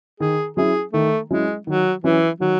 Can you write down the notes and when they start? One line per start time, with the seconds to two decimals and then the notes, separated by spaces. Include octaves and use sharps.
0.20 D#3 G#4
0.57 F#3 C#4 E4 G#4
0.93 D#3 A3
1.30 F#3 G#3 C#4 E4
1.67 D#3 F#3
2.04 E3 F#3 C#4 E4
2.40 D#3 F#3